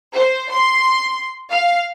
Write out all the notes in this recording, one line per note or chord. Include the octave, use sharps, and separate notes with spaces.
C5
C6
F5